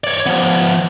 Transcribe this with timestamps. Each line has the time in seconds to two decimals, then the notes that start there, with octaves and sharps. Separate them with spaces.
0.04 C#5 D5
0.26 F3 B3